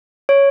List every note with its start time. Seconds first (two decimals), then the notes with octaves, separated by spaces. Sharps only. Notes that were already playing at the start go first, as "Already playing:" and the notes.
0.29 C#5